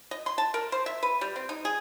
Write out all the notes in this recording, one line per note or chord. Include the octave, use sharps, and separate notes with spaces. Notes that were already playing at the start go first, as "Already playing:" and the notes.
D#5
C6
A5
A#4
C5
E5
B4
G3
C4
D#4
G#4